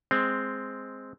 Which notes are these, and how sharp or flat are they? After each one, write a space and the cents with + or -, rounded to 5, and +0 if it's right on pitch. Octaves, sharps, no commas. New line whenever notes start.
G#3 +0 C4 +0